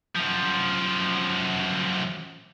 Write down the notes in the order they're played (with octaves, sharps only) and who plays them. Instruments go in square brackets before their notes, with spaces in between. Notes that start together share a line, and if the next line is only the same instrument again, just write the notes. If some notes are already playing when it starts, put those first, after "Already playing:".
[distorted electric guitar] F#2 F3